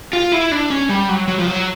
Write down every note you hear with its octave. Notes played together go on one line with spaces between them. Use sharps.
F4
E4
D4
C#4
G3
F#3
F#3
F3
F#3